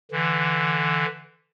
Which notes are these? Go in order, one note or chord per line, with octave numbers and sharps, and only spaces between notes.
D3 E3